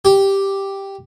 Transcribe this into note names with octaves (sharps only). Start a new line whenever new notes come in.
G4